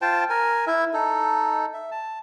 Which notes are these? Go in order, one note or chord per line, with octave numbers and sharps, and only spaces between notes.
F4 C5 G5 A5
A#4 G#5
E4 E5
D#4 A4
E5
A5